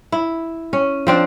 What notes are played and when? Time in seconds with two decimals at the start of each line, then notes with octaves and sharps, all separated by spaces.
0.12 E4
0.73 C#4
1.07 F3 C4 D4